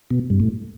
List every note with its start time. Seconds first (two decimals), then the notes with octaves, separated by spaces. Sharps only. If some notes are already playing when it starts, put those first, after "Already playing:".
0.10 B2
0.30 G2
0.40 A2